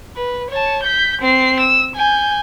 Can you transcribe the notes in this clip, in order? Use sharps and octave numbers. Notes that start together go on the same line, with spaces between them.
B4
C#5 A5
G6 B6
C4 C7
E6
G#5 G6